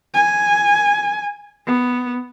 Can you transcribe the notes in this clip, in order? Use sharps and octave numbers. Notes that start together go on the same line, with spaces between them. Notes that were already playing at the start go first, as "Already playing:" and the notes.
G#5
B3